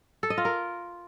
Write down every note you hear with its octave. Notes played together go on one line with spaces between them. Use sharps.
A4
D#5
F4
A#4